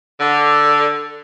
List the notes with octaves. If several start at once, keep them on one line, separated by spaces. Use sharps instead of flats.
D3